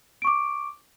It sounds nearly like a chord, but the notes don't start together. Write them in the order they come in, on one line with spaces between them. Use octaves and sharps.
D7 C#6 D6